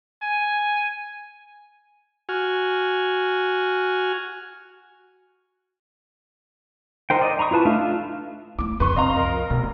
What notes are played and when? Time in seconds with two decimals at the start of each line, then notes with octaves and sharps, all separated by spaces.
0.22 G#5
2.29 F#4 G#5 F6
7.10 D#4 A#4 C5 G5
7.22 D5 D#5
7.39 A#5 B5 C#6 D#6
7.51 E4 F4 B4 A5
7.65 A3 D4 D#4 E5 F5
7.79 F4
8.59 A3 E4 D6
8.80 F2 C#3 B4 C6 C#6
8.96 C3 E3 C4 D#5 F5 A#5
9.16 C2 F2 A#4
9.50 F1 B2 A3